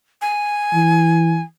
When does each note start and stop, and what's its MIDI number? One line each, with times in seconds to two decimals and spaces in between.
0.22 1.42 80
0.74 1.39 52